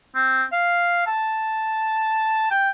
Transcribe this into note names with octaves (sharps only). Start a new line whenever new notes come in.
C4
F5
A5
G5